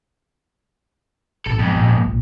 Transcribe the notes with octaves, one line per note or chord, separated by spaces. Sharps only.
A1 B2 A4
F2 G#2 B3
G#1 A#2
G3 A#3
A#1 A#2